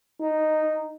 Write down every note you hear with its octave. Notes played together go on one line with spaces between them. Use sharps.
D#4